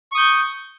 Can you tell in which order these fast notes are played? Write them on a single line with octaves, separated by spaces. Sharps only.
C#6 D#6 G6